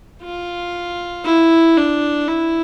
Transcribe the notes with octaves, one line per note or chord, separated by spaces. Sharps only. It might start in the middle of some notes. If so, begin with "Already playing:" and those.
F4
E4
D4
E4